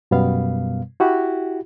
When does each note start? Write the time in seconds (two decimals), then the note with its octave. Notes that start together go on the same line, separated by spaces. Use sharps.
0.11 F#2 B2 G3 B3 F5
1.00 E4 F#4 G4